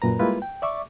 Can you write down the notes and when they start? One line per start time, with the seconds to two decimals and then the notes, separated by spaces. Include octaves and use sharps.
0.02 C2 F#2 A#2 B4 A#5
0.19 G3 G#3 A#3 E4 F4 B4
0.42 G5
0.62 D5 E5 C#6 D6